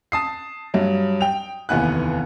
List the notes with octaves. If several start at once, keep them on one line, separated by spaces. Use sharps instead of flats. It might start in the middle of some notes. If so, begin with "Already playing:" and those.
A5 D#6 C7
G2 F#3
G5 F7
F1 D#2 E3 B3 G#5 F#6